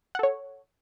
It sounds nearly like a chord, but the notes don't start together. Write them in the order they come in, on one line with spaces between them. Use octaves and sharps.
F#5 A4 C#5